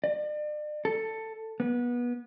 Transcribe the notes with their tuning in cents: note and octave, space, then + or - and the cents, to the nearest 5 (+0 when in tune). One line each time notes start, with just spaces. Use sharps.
D5 +40
A4 +10
B3 -25